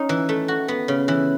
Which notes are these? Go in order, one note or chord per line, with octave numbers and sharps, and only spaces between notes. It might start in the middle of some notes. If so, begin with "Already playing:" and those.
Already playing: C#4 D#4
E3
A3
F#4
B3
C#3
E3